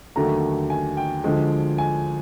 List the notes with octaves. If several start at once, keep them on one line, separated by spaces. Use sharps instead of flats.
D#2 D3 F#3 A3 A#5
G#5
G5
D2 D3 F3 G#3
G#5